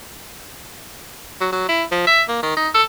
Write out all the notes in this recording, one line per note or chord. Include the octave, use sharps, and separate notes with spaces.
F#3
F#3
E4
F3
E5
A#3
D#3
D#4
A4